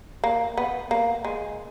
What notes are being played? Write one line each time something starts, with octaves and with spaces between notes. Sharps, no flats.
A#3
B3
A#3
G#3